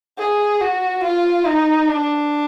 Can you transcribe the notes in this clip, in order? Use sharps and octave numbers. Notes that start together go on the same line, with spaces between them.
G#4
F#4
F4
D#4
D4